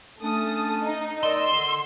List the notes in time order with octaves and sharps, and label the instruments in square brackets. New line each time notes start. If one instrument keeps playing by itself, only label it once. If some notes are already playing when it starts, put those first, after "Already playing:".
[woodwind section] A3 C#4 D4 [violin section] A4 A5 D#6
[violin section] D#4
[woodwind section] A#4 D5 D#5 [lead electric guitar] C6 [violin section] E6
[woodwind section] D3